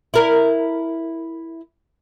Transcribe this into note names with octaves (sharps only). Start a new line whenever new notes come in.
E4 A#4